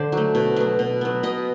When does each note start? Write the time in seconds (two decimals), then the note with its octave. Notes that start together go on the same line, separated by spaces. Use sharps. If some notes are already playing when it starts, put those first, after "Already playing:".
Already playing: D3 C5 D5
0.12 F#3
0.17 A3
0.35 B2
0.56 F#3 B3
0.79 B2
1.01 F#3 B3
1.23 B2 D#5